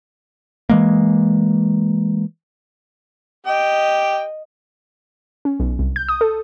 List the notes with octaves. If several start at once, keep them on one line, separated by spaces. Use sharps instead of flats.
E3 G#3 A#3
G4 D#5 G5
C#4
B1
C2
G6
D#6
A4